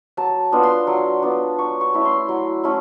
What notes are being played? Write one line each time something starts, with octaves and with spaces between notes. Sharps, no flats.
F#3 A5
B3 D4 F4
C6
F#3
B3 D4 F4
F#3 C#6
C#6
A3 C#4 E4
C6
F#3
A3 C#4 E4